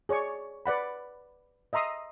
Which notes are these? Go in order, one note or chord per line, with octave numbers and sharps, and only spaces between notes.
G#4 C#5 D5 C#6
B4 D5 F#5 B5
D#5 E5 A#5 C6 D#6